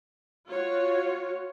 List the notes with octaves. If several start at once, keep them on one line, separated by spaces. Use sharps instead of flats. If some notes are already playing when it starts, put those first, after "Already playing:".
F4 F#4 C#5